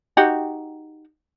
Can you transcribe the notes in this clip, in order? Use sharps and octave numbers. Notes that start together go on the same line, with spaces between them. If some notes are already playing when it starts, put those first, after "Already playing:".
D#4 F#4 G4